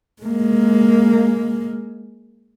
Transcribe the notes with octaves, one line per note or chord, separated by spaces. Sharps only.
G#3 A#3